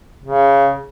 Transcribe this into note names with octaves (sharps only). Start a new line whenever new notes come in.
C#3